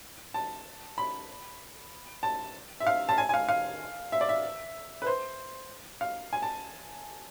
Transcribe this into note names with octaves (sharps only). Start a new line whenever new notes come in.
A5
B5
A5
E5
F5
A5
G#5
G#5
F5
F5
E5
D5
E5
B4
C5
F5
G#5
A5